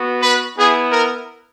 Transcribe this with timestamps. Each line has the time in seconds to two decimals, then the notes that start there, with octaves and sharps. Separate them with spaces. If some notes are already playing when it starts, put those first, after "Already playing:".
Already playing: B3 F#4
0.22 B4
0.57 B3 E4 G#4
0.92 A#4